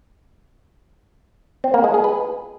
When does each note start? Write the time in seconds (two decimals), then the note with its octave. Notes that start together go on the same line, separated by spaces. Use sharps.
1.64 C4
1.74 A#3
1.84 G#3
1.94 G#4
2.04 B4